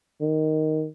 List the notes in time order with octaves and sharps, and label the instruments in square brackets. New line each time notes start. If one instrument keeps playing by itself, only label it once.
[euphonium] D#3